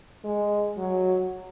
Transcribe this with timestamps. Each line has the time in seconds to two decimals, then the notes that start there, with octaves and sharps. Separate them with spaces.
0.24 G#3
0.77 F#3